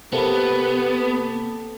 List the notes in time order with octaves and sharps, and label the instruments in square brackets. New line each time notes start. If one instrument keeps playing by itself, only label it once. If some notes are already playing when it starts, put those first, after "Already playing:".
[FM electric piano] C3 A#3 [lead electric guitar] B3 [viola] G4 [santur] A4 B4